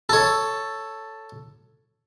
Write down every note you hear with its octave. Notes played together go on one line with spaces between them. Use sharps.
A4 C#5